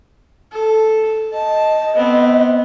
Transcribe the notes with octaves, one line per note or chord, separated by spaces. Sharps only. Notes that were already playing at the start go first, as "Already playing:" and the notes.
A4
D#5 A5
B3 C4